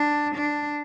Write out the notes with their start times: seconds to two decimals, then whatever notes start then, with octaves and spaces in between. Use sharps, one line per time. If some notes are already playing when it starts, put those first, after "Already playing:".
Already playing: D4
0.35 D4